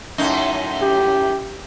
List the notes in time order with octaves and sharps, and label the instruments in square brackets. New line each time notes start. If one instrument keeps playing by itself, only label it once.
[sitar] F#2 A2 D#4
[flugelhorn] G4